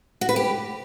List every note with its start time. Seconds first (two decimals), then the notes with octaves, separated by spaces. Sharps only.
0.21 F#4
0.29 B4
0.36 G4